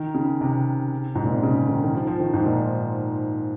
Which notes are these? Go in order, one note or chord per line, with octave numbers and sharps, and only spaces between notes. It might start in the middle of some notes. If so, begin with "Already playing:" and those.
Already playing: D#3
C#3
C3
G#2
A#2
C3
C#3
D#3
D#3
F3
F3
D#3
G#2
A#2